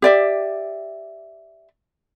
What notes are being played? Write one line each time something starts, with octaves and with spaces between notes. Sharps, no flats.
G4 D5 E5